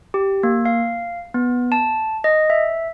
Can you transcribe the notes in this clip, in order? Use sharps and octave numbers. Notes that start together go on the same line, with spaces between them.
G4
A#3
F5
B3
A5
D#5
E5